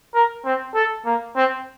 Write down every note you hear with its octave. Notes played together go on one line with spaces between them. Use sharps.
A#4
C4
A4
A#3
C4